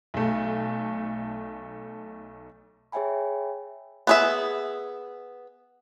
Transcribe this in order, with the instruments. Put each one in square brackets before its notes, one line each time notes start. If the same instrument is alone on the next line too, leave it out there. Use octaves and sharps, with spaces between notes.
[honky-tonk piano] B1 A3
[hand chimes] G#4 C#5 E5 G5 G#5 B5
[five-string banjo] B3 G#4 E5